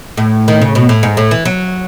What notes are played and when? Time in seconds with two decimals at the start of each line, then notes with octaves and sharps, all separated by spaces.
0.17 A2
0.48 D#3
0.61 C#3
0.75 B2
0.89 A2
1.03 G#2
1.17 A2
1.31 E3
1.45 F#3